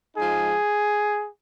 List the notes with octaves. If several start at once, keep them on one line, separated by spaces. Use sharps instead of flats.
F3 G#3 D#4 G#4